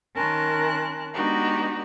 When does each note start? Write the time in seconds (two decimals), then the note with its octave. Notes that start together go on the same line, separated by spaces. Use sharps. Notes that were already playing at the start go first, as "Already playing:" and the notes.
0.16 D#3 C#4 A#4 A5 C6 F#6
1.14 G#3 B3 D4 D#4 F#4 G4